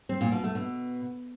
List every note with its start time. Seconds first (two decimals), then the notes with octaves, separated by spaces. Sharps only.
0.09 C4
0.21 A#2
0.32 B2
0.44 A3
0.55 B2